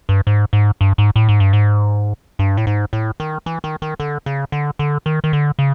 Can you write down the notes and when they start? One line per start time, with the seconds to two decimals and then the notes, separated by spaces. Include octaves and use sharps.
0.09 G2
0.27 G#2
0.53 G#2
0.81 G2
0.98 G#2
1.16 A2
1.29 G#2
1.40 G2
1.53 G#2
2.39 G2
2.57 A2
2.67 G#2
2.93 A2
3.20 D#3
3.46 E3
3.64 D#3
3.82 D#3
4.00 D3
4.26 C#3
4.52 D3
4.79 D3
5.06 D#3
5.24 D#3
5.33 D3
5.59 C#3